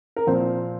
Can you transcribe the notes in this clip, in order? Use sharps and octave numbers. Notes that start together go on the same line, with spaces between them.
A#4
A#2 F3 C4 C5